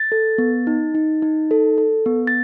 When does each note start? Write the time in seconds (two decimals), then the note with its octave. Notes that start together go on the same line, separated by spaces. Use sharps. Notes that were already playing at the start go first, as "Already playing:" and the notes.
Already playing: A6
0.12 A4
0.38 B3
0.67 D#4
0.95 D#4
1.22 D#4
1.51 A4
1.78 A4
2.06 B3
2.27 A6